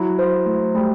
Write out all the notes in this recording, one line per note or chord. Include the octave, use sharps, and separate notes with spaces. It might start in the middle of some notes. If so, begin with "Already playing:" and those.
Already playing: F#3 E4
C5
A3
G3 A3